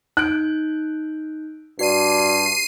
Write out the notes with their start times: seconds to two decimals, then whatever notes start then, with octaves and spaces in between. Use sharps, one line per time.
0.17 D#4 F#6 G6 D7
1.79 G2 F#4 D5 C7 D#7